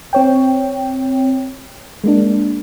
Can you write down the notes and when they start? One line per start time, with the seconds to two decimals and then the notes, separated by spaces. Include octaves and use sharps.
0.13 C4 C#5 G5
2.04 G#3 A#3 D4